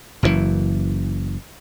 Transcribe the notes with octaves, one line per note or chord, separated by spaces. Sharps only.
F#1 F#2 B2 E3